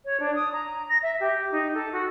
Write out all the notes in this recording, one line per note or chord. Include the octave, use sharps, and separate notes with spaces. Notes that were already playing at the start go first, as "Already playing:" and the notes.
C#5
D4
D#6
A#5
A#6
E5
G4
D#4
A4
F#4